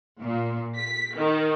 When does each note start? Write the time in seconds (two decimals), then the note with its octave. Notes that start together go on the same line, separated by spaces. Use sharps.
0.20 A#2
0.77 B6
1.16 D#3